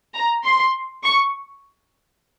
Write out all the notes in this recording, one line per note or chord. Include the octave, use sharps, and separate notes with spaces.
A#5
C6
C#6